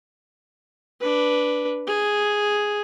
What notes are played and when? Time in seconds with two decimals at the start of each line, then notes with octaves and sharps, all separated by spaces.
1.01 D4 B4
1.87 G#4